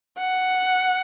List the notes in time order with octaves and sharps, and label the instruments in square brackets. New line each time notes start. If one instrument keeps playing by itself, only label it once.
[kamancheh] F#5